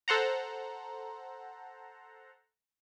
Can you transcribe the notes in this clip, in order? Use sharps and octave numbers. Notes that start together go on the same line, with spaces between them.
A4 C5 F#5 A#5